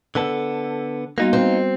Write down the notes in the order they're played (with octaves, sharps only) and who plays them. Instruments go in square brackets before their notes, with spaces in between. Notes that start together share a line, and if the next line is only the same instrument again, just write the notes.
[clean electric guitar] D3 B3 A4
[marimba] G3 B3 F#4 [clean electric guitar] A#3 D#4 F4
[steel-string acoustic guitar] C4